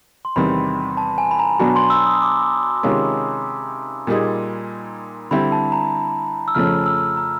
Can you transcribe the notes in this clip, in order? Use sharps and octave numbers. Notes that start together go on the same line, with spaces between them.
C6
E2 C3 D#3 G3 C4 B5
A5
G#5
B5
A#5
B2 F#3 B3 D4 F#4 B5
C6
E6
D#6
D6
C3 D#3 G#3 C#4 F4
A#2 G3 A#3 D#4 G#4
D3 G3 C4 E4 B5
A5
A#5
E6
F2 C#3 F3 A3 C#4 F6
E6
A#5